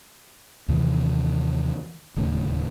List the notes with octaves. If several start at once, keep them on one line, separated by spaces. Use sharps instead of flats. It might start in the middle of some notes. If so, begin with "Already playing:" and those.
D#2 C3 D#3 E3
D1 D#2 A2 C#3